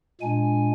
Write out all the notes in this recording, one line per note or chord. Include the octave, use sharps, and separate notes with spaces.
A#2 G#3 D4 G#5